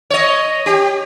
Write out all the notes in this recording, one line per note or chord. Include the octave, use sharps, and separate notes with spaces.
C#5 D#5
G4